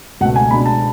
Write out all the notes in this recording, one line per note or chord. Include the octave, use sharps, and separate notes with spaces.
C#2 B2 A3 F#5
G#5
B2 G#3 B3 D4 B5
A5